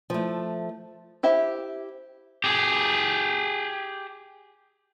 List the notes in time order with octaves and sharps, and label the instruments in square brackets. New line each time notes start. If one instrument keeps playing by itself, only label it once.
[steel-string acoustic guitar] F3 A3
[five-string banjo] E4 G4 C5 E5
[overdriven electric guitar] G4 G#4